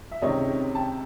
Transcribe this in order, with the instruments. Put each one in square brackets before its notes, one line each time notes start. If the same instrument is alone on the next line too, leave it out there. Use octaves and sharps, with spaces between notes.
[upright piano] E5
C#2 C3 D#3 C#5 D#5
G5 A5